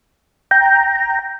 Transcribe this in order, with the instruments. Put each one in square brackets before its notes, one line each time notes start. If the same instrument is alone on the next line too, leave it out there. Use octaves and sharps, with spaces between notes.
[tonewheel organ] G5 A#5